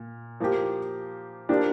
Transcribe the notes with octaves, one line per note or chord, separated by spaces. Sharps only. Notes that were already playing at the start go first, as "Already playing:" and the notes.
Already playing: A#2
F3 A#3 G4
F3 A#3 D4 G4